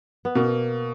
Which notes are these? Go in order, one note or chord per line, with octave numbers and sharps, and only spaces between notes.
B3
B2 A#3